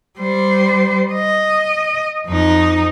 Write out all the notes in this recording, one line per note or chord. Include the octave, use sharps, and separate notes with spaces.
G3 C5
D#5
F2 D#4